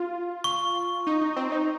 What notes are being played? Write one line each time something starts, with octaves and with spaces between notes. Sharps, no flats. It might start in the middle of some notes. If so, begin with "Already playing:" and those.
Already playing: F4
C#6
D#4
D#4
C4
D#4